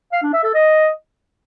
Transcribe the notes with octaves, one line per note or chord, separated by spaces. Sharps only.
F5
D4
E5
A4
D#5